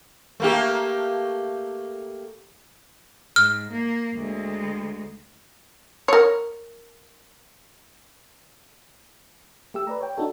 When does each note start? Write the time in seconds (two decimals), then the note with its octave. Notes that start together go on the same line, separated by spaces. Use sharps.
0.40 A3 A#3 G4
3.36 G#2 F6
3.71 A#3
4.14 D2 G#3
6.08 A#4 C#5
9.74 A3 G4 E6
9.87 B4 D5 A#5
10.01 C#5 G5
10.17 D4 D#4 F#4 A4 C#5